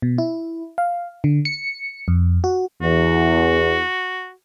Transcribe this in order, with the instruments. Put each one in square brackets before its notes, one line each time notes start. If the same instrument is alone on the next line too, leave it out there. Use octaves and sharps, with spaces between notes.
[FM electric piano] B2
E4
F5
D3
C#7
F2
F#4
[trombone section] E2 [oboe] F#4